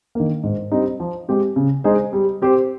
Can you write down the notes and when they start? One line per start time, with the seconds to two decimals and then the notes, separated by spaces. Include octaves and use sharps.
0.15 D#3 A#3
0.43 G#2
0.72 G3 C4 D#4
1.00 F3
1.28 G#3 C4 G4
1.56 C#3
1.84 G#3 D#4 G#4 C5
2.13 G3
2.42 C4 G4 C5